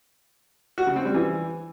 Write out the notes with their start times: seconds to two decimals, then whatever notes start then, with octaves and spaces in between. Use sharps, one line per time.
0.78 F#4
0.87 C#3
0.96 C4
1.05 G3
1.14 E3